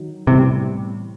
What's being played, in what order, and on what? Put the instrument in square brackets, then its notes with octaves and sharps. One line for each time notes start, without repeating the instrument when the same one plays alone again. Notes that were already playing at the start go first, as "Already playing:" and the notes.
Already playing: [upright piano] D#3 F#3 D#4
[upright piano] A2 E3 G3 B3 [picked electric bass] C3